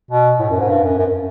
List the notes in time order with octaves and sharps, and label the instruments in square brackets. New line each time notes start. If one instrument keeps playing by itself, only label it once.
[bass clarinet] B2
A2
F#2
G#2
G2
F#2
F#2